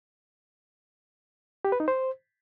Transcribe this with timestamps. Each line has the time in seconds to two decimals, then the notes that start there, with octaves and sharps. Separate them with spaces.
1.65 G4
1.72 B4
1.80 D#4
1.88 C5